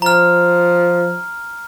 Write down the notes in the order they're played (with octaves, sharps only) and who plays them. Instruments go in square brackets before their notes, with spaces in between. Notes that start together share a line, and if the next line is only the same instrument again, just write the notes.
[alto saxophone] F3 [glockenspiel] A#5 F6